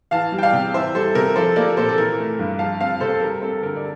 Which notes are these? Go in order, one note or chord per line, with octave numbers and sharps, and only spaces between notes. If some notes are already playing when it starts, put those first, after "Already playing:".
E3 F5 A5
G3
G5
D5 F5
C3
E3 C5 E5
G3 A4 C5
C3 A#4
F3 A4 C5
A#3 A#4 D5
A#2 A4 C5
A4
E3 A#4
A3
G2
F3 F5 A5
C4 F5 A5
C3 A4 C5
G3 A#4
C4 A4
D3 A#4
D5